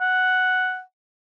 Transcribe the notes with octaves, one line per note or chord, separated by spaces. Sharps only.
F#5